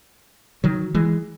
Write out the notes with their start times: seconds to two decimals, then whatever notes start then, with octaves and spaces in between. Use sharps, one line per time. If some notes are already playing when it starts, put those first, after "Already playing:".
0.64 D#3 F#3
0.95 E3 G#3